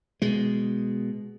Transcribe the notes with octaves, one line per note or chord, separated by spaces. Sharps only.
B2 G#3